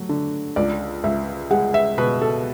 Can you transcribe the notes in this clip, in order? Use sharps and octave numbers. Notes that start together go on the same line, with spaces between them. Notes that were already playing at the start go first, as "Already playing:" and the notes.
Already playing: F#3 A3
D3
C#2 D5
C#2 E5
G#3 F#5
E5
B2 B4
A4